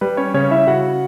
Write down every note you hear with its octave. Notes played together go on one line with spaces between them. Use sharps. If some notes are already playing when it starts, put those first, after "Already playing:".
G3 B4
C#4 C#5
C#3 C#4 C#5
E4 E5
C#3 F#4 F#5